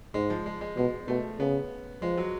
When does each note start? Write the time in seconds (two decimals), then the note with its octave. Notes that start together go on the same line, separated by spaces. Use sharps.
0.14 G#2 G#3
0.30 F3
0.46 G#3
0.61 G#3
0.77 B2 G#3
1.08 B2 A3
1.39 C#3 B3
2.02 F3 G#3
2.17 F#3